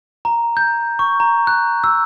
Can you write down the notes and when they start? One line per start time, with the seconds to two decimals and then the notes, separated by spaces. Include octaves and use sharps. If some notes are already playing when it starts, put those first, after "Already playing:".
0.25 A#5
0.57 G6
0.99 C#6
1.20 A#5
1.47 F#6
1.84 E6